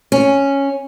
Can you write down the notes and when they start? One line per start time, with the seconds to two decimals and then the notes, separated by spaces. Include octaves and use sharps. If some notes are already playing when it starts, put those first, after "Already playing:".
0.12 C#4